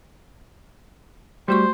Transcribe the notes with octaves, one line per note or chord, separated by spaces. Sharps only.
G3 A3 F#4 C5 C#6